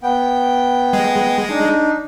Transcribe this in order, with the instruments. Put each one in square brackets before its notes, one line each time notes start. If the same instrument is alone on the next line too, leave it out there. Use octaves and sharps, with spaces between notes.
[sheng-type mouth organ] B3 G5
[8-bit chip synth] G#3
[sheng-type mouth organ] D4 D#4